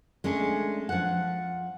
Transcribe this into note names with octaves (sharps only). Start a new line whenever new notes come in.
G#3 A3 C#4 D4
F3 F#5